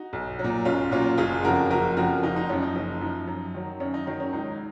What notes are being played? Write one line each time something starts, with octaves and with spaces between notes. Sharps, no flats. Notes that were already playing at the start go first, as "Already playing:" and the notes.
Already playing: D#4 F#4
B1
F#3
A#2
B1 C#4 F4
A#2 F#3 C#4 F4
F#1 F4 G#4
F2 C#3 F3 F#4 A#4
F#1 F#4 A#4
F2 C#3 F3 F#4 A#4
F#1 D#4
D#4
F#2 F3 C#4
D#4
F#1
F#2 F3
F#2
D#3 F#3
F#2 C#4
D#4
D#3 F#3 D#4
C#4
C#2 D#4